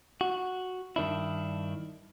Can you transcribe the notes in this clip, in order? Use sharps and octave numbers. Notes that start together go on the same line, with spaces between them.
F#4
G2 D#3 D4 E4